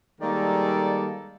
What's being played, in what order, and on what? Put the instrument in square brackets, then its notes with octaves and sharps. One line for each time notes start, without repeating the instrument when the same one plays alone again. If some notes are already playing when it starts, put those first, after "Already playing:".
[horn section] D#3 G3 G#3 A#3 A4 D5